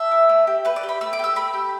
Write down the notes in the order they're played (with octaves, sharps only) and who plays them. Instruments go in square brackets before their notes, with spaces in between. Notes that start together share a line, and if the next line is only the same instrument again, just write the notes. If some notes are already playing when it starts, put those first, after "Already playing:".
Already playing: [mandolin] A4 E5
E4
A3
G4
A3 B4
D5
G4
B5
A3 E6
D6
G4 E6
A3 B5
G4